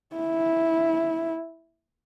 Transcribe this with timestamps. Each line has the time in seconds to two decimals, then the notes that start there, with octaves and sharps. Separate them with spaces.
0.16 E4